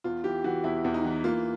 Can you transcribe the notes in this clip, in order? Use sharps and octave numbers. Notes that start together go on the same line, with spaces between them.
E2 F4
E3 G4
E3 F#4
E2 E4
E2
D#4
E3
A#3 F4